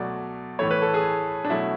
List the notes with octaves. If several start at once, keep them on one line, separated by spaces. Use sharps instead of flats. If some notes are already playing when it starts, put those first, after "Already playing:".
Already playing: B2 F#3 A3 D5
A2 E3 A3 C#5
B4
A4
G#4
D4
B2 F#3 A3 E4